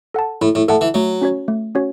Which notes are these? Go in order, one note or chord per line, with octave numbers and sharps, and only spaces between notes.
A4 F#5 A5
A2 E4
A2
A2 A4 F#5 A5
E3
F#3 A3
C#4 F#4 C#5
A3
C#4 F#4 C#5